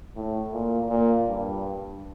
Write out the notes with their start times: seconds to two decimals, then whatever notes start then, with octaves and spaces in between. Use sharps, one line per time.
0.16 A2
0.53 A#2
0.89 A#2
1.27 G2